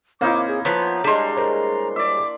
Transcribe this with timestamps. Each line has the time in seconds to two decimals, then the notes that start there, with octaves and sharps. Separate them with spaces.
0.21 A#3 C4 D#4 E4 C#5 F5 D6
0.48 G#4
0.65 F3 B3 C#5 A#5
1.04 G3 G#3 D4 C6
1.37 A#4 C5 C#5
1.96 D5 E5 D6